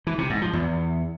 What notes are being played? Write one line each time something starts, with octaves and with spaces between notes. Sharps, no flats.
E3
C3
G#2
F3
E2